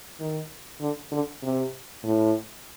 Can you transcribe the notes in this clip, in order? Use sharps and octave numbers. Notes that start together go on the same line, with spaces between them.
D#3
D3
D3
C3
A2